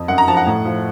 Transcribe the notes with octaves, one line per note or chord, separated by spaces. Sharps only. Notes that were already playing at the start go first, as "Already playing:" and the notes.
Already playing: F2
F#2 F#5
A#5
F3 A5
F#5
A2
F3